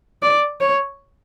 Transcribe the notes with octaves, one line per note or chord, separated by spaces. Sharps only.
D5
C#5